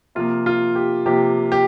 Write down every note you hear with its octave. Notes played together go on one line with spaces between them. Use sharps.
C3 F3 A#3 F4
F4
G4
C3 F3 A#3 G4
G4